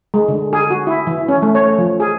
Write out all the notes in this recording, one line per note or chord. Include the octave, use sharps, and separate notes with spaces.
G#3
D3
G#4
F#4
E4
E3
C#4
A3
C#5
F3
G#4